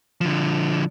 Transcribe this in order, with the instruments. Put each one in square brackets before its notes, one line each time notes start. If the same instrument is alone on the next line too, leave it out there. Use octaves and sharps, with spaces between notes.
[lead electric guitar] D3 F3